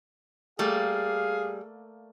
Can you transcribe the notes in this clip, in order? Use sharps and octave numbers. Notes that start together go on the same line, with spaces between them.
G3 A3 A#3 G#4 F5